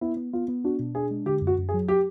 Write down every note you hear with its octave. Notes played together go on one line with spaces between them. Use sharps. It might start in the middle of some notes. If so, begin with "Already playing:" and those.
B3 E4
B3
B3 F4
B3
D4 F#4
B2
D4 G#4
G#3
D3 G4
F#2
F#4
F#2
G#4
F#3
G4